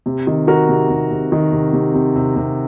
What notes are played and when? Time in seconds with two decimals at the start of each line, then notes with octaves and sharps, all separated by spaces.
0.06 C3
0.27 D#3
0.47 D#3 F#4 A#4
0.69 C3
0.90 C3
1.11 C3
1.32 D#3
1.52 C3
1.73 C3
1.94 C3
2.16 C3
2.36 C3